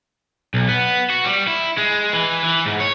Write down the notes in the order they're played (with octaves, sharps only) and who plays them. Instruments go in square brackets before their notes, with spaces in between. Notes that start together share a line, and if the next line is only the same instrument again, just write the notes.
[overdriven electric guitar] B1
B3
F#4
G3
E4
G#3
E3
E3
G#2
C#5